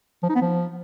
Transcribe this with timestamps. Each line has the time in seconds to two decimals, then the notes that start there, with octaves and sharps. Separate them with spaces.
0.23 F3
0.29 D#4
0.35 B3
0.41 F3